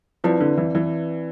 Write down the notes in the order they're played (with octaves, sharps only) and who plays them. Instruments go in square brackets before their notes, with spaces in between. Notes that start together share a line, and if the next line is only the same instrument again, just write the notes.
[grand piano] F3 [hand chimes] C4 E4 B4 D5
[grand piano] D3
E3
E3